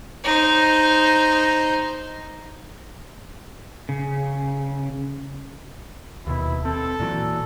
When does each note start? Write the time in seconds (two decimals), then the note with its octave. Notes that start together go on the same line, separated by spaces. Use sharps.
0.24 D#4 C5
3.89 C#3
6.27 D#2 B2 E4
6.65 C4 A4
7.00 A#2 E3 F#3